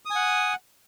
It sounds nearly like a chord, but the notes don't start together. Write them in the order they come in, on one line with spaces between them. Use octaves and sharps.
D#6 G#5 F#5